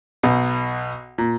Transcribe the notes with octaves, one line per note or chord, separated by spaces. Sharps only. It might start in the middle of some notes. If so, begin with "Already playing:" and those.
B1 B2
A#2